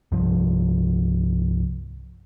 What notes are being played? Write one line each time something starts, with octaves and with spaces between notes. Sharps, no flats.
C2 G2 F3